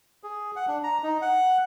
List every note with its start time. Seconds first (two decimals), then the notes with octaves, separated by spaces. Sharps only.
0.23 G#4
0.56 F#5
0.68 D4
0.84 A#5
1.03 D#4
1.22 F#5